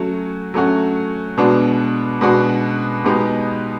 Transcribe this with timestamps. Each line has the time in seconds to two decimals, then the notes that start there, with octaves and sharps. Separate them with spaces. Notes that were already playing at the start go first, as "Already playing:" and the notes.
Already playing: F#3 A3 C#4 F#4
0.54 F#3 A3 C#4 F#4
1.37 B2 G#3 B3 D4 F#4
2.21 B2 G#3 B3 D4 F#4
3.04 B2 G#3 B3 D#4 G4